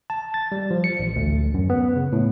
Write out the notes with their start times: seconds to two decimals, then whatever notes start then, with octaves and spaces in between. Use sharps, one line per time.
0.10 A5
0.34 A6
0.52 G3
0.71 F3
0.84 C#7
1.00 A1
1.16 D2
1.54 F#2
1.70 B3
1.96 C#3
2.13 A2